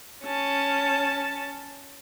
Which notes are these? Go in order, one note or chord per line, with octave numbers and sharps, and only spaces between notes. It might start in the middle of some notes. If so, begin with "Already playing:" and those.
C#4 A5